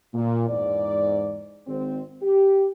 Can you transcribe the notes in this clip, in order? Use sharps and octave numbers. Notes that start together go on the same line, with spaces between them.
A#2
E2 G#2 D5
G#1 C4
G4